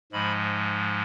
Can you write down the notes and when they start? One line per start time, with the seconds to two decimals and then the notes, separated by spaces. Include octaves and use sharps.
0.12 G#2 F3 G#3 B5